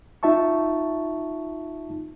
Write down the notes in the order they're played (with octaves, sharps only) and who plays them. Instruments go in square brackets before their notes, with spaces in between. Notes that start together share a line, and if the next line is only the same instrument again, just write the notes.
[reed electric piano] D#4 F4 E5 A5 C#6